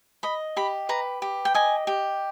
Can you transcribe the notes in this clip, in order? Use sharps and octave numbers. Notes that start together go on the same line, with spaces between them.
D#5 B5
G4 B5
B4 A#5
G4
G5
D#5 G#5
G4